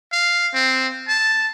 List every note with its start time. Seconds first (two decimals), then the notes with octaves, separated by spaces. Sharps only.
0.12 F5
0.54 C4
1.08 A5